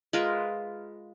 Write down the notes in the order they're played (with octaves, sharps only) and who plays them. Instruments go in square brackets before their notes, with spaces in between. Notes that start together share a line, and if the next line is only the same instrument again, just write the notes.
[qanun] G#3 F4 A#4 B4